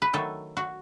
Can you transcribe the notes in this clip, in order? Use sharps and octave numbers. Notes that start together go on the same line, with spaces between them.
B4
D#3 F#3 A3 A4
F#4